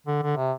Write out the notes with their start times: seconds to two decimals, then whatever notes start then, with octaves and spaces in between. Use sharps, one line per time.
0.07 D3
0.23 D3
0.37 C3